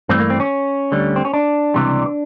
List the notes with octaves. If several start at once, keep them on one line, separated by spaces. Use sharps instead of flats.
G2 E3 A3 C4
A#3
C4
C#4
D2 D3 G3
C4
C#4
D4
C#2 C3 E3 G3